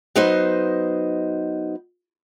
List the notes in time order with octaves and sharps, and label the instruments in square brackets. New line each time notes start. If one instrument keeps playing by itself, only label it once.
[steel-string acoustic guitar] F#3 B3 D#4 C5 D#5